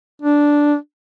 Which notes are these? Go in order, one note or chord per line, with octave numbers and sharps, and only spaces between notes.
D4